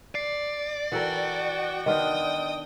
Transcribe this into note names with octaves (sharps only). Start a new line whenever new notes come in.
D5 C7
E3 F#4 A4 A#4 G5
D#3 B3 D4 D#5 G5 C6 D#6 F6